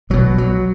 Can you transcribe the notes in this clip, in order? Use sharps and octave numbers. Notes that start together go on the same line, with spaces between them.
B1 B2 F#3
F#3